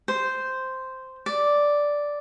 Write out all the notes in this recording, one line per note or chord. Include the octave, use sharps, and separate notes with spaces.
C5
D5